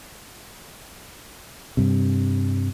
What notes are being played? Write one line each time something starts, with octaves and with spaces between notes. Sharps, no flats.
G2 C3